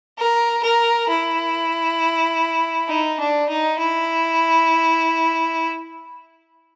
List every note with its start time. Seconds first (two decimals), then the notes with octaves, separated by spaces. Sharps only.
0.18 A#4
0.63 A#4
1.09 E4
2.88 D#4
3.19 D4
3.49 D#4
3.79 E4